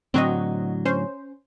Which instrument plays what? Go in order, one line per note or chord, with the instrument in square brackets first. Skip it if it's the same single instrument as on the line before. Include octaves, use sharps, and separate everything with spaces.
[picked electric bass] A2 D3 F#3 [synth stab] C4 F#4 D#5
[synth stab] C#4 C5